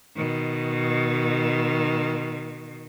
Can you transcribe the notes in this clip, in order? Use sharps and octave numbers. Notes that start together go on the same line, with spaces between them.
B2 D#3